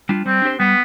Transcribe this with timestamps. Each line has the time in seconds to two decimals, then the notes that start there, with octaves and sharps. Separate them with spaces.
0.09 G3 D4 F4
0.26 G3 C4
0.42 D4 G4 C5
0.59 G3 B3